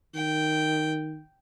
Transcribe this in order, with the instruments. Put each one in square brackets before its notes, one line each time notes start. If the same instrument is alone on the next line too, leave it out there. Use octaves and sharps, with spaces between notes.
[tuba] D#3 [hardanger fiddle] G5